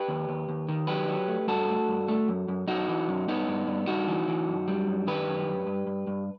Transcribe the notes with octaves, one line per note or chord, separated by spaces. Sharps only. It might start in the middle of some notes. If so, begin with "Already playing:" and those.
Already playing: G4 B4
D#2
D#2
D#2
D#3
F#3 G4 B4
F#3
A3
G2 F#4 A4
A3
G2
A3
F#2
F#2
F#2 D#4 F#4
E3
F#2
G2 B3 D#4
G2
G2
G2 D#4 F#4
E3
E3
F#2
G3
F#2
D#3 G4 B4
F#2
F#2
G2
G2
G2